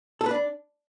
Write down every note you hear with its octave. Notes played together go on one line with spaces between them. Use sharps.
A4
B4
D4